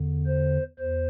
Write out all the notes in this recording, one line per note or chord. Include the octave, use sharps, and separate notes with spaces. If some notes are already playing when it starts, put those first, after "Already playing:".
Already playing: E2 D3
C5
E2 C5